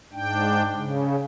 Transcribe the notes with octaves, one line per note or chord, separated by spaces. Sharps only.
G#2 D4 G5
C#3